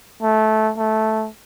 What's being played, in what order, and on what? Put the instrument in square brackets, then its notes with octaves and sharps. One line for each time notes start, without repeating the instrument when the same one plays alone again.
[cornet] A3
A3